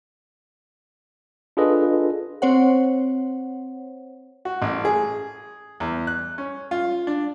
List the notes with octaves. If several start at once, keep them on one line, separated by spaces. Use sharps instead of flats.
D4 F4 G#4 A4 B4 D#5
C4 C5 C#5 F#5
F#4
A1
G#4
E2
F#6
C#4
F4
D4